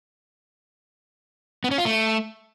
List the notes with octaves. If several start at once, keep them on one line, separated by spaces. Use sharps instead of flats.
B3
C#4
F4
A3